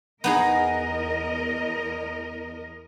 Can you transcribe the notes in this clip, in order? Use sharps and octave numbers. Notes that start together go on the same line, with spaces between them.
E2 B3 D#4 G#4 A#4 D#5